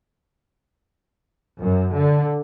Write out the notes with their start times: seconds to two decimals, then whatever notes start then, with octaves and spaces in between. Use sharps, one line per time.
1.61 F#2
1.95 D3